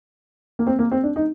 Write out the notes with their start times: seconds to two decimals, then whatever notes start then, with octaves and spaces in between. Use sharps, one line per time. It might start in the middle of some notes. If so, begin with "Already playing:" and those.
0.59 A#3
0.67 C4
0.79 A#3
0.92 C4
1.03 D4
1.16 D#4